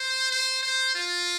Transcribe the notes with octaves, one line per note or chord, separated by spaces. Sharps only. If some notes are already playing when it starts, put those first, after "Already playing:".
Already playing: C5
C5
C5
F4